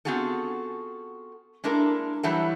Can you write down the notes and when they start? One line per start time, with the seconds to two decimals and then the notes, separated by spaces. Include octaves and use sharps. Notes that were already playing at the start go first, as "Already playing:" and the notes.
0.05 B3 C4 F4 F#4 G#4 A4
1.64 G#3 A#3 D4 E4 A4 A#4
2.23 E3 F#3 G3 E4 F#4 A4